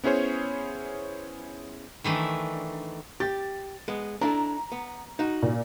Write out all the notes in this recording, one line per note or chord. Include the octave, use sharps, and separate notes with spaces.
B3 C#4 E4 G#4 C5 C#5
D#3 E3 A3 D4
G4 A6
G#3 B3
D4 E4 A4 A#5
B3
D#4 F#4
A#2